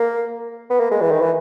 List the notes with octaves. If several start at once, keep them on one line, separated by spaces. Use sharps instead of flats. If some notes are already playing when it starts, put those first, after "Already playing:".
Already playing: A#3
B3
A#3
G#3
E3
D#3
E3